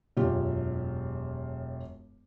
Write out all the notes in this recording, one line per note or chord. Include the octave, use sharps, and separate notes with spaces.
E1 F#2 F4 G4